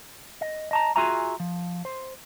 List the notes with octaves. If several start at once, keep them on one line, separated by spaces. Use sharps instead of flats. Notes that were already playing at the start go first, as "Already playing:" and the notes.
D#5
D#5 A5 A#5
F4 F#4 G#4 E5 G#5 A#5
F3
C5